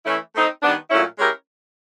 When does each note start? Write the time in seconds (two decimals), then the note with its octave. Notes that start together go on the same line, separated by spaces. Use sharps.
0.06 E3 A3 C#4 E4
0.34 A3 C4 D#4
0.62 D#3 G3 B3 D4
0.90 A#2 F#3 A3 C#4 E4
1.19 G#3 C#4 E4 G4 A#4